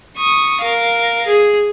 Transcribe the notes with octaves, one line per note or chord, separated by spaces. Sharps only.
C#6 D#6
A#4 F5
G#4